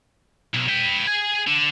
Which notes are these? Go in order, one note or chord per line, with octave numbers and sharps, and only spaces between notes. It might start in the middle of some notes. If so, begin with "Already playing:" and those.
B1
B4 G5
G#4 G#5
D3